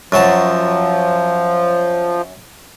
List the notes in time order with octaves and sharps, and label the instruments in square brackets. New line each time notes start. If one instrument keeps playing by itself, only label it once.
[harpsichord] F#2 F#3 A5 [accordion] F3